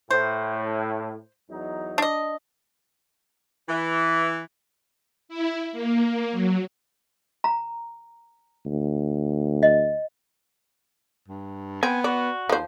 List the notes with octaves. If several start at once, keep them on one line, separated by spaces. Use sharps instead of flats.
A2 C5
E2 F#3 D#4
D4 D#5
E3
E4
A#3
F#3
A#5
D2
D#5
G2
B3 C4 G#5
F#4 D5
D#2 F3 C5